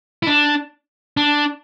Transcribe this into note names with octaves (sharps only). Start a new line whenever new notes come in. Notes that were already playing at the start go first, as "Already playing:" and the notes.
E4
D4
D4